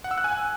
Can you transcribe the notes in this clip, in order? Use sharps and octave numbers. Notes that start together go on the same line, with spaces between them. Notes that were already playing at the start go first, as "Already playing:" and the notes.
F#5
E6
F#6
G#5